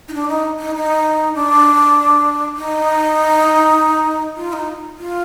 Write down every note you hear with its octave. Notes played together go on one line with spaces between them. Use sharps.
D#4
D4
D#4
D#4
D#4
D4
D#4
F4
D#4
F4